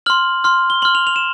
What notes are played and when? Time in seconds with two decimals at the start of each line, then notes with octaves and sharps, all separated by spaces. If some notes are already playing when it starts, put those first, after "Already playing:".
0.06 C6 F6 F#7
0.44 C6 F6
0.70 G7
0.82 C6 F6 F#7
0.95 F7
1.07 F7
1.16 E7